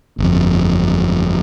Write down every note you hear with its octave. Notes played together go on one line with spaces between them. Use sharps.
G1 F2